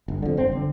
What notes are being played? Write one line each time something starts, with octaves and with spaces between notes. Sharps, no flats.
G1
F2 D3
G1 C4
D3